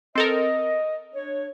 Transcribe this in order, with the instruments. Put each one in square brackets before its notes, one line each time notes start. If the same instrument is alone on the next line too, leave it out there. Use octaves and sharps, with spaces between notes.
[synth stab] C4 A4 A#4 [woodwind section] D#5
[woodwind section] D4 C#5